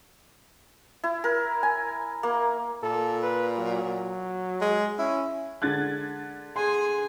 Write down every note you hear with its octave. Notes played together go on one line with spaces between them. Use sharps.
E4
A#4
G#5
A#3
A#2 A4
B4
F#3
G#3
C#4 E4
D3 G#3 F#6 G#6 A6
G#4 G#5 C6